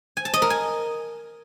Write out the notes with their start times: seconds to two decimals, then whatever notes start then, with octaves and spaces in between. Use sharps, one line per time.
0.17 G#5
0.25 A5
0.34 D#5
0.42 A#4
0.50 G#5